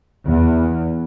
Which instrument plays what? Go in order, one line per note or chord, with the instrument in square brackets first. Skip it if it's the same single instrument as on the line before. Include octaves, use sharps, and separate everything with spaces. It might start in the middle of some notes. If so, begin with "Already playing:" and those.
[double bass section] E2